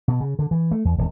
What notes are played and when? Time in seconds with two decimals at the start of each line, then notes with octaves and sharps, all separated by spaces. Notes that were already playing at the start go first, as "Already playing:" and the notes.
0.08 B2
0.21 C#3
0.39 D3
0.51 E3
0.71 A3
0.85 E2
0.98 D#1